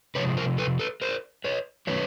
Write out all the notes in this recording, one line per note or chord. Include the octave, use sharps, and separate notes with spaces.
C3 F3 G#3 B4 C#5
A#4 C5
A4 B4
A4 B4
A#4 C5
B4 C#5
D#3 F#3 A3 C#4 B4 C#5